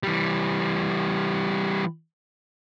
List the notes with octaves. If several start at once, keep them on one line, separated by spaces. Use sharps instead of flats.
E3 G3